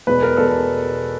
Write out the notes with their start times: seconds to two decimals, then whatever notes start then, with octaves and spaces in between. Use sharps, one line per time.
0.07 E2 B2 G#3 B4
0.23 A#4
0.37 E2 B2 G#3 A4